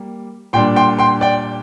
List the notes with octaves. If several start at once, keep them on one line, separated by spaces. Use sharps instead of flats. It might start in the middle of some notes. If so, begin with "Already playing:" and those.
Already playing: G3 A#3
A#2 G3 D4 G5 C6
G5 C6
G5 C6
D5 G5